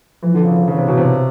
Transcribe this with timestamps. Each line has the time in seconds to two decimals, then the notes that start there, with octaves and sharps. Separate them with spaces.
0.23 E3 F3
0.34 D3
0.45 C#3
0.57 C#3
0.67 C#3 E3
0.78 C3
0.88 B2
0.98 C3